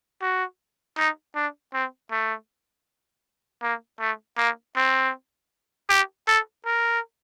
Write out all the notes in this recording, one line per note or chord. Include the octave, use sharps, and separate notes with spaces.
F#4
D#4
D4
C4
A3
A#3
A3
A#3
C4
G4
A4
A#4